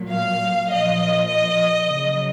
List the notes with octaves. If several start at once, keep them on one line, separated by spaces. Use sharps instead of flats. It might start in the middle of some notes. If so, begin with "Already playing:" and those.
Already playing: A#2 F#3
F5
A#2 F3 D#5
D#5
C#3 F#3